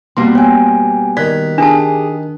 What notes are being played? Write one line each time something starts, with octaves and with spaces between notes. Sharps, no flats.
B2 G3 A#3 C6
C#5 G5 G#5
D#3 D5 F#6 B6
D4 G4 G#4 A5